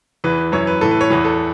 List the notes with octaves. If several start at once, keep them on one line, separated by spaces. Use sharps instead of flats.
E2 E3 B4
F#2 E3 C#5
B4
A2 E3 A4
B4
C#5
E2 E3 B4
A4